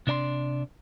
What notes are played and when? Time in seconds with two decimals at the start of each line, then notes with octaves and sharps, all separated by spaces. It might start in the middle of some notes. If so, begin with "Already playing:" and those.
0.07 C3 D4 D5 A#5 C6